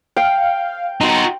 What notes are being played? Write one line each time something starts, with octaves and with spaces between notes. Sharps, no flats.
F5 G5
D#4 F#4 A#5 C6